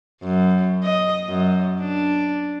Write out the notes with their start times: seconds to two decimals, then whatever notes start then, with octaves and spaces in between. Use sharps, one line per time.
0.23 F#2
0.83 D#5
1.28 F#2
1.81 D4